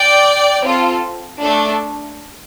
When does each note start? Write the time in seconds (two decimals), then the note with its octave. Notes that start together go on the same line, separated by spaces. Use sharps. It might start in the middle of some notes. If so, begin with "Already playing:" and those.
Already playing: D5 G5
0.64 C4 F4 A4
1.41 A3 D4 A4